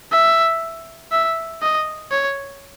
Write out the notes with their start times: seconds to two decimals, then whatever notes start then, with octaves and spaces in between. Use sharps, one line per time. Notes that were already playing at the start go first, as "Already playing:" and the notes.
0.13 E5
1.12 E5
1.62 D#5
2.11 C#5